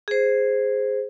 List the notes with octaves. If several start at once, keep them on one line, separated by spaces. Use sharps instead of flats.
G#4 C5